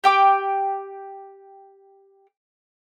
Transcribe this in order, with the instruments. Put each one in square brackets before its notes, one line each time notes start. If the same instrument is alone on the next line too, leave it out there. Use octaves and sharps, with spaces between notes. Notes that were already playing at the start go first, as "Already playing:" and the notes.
[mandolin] G4 G5 D6